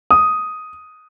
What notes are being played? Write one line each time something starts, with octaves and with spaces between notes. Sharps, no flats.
D#6